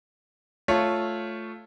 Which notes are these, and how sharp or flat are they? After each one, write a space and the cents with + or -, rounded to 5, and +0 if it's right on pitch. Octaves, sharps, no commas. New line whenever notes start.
A3 +0 F4 +0 C#5 +0